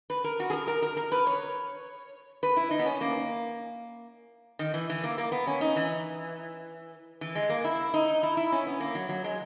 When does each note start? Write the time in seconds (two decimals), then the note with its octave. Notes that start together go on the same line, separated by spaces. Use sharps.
0.10 B4
0.24 A#4
0.40 F#4
0.50 G#4
0.53 A#4
0.68 A#4
0.82 A#4
0.97 A#4
1.12 B4
1.27 C#5
2.43 B4
2.57 E4
2.71 D#4
2.79 B3
2.86 C#4
3.01 A#3
4.59 D#3
4.74 E3
4.90 E3
5.04 A#3
5.18 A#3
5.32 B3
5.47 C#4
5.61 D#4
5.76 E3
7.21 E3
7.35 G#3
7.49 A#3
7.64 E4
7.94 D#4
8.23 E4
8.37 E4
8.52 C#4
8.67 B3
8.80 A#3
8.95 F#3
9.09 F#3
9.24 G#3